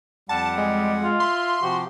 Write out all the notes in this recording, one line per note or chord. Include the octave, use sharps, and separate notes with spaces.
F2 G3 F#5 A5
G#3
F4
E5 C6
C3 F3 F#4 G4